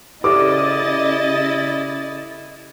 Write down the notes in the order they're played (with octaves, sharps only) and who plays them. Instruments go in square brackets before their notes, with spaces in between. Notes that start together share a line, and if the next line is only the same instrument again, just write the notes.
[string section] C#3 D#5 A6 [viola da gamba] E4 [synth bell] G4 A4 D5 [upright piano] D6